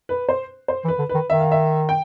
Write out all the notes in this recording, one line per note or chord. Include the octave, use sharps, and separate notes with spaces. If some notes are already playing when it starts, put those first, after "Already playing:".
B4
C5
C5
E3
B4
D3
D#3 B4
D#3 E5
F5
E5
G5